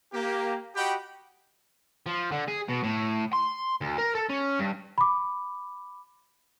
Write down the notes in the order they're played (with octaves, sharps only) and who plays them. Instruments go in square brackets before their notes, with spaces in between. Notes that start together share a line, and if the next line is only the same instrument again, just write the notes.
[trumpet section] A#3 G4
F#4 G4 D#5 F#5 G5 B5
[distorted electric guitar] F3
D3
G#4
B2
A2
C6
D2
A#4
A4
C#4
G2
[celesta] B5 D6